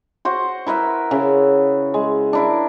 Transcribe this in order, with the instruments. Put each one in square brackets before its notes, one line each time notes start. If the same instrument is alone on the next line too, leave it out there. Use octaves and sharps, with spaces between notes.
[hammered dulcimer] F#4 C5 F#5
E4 A#4 B4 E5
C#3 E5
G#3
D4 E4 A#4